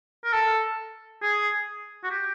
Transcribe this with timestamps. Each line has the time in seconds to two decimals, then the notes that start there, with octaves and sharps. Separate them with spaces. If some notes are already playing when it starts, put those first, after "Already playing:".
0.24 A#4
0.33 A4
1.22 G#4
2.04 F#4
2.11 G4